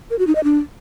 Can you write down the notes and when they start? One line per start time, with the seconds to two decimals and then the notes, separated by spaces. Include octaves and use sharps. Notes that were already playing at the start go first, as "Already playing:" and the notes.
0.10 A#4
0.19 F#4
0.27 D#4
0.35 D#5
0.44 D4